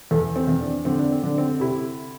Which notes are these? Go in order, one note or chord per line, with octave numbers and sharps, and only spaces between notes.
E2 A4
C4
E2 C4
D4
D3 C4
D4
C4
D3 D4
C4
C3 E4